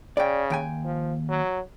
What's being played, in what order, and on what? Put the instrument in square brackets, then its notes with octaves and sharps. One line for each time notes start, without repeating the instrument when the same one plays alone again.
[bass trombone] C#3 [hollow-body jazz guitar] D5 G5
[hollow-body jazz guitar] D#2 G5 G#5
[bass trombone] F3
F#3